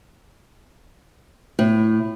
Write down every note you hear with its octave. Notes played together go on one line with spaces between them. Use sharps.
A2